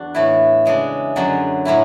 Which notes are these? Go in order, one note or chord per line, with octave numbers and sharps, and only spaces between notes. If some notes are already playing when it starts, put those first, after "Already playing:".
Already playing: E2 D4 F#4
A2 E3 A3 E4
C#3 G#3 D4
F#2 D3 F#3
A2 F#3 C#4 E4